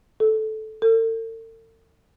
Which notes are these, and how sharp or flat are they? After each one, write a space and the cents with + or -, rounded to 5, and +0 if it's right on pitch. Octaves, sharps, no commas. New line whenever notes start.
A4 -15
A4 +45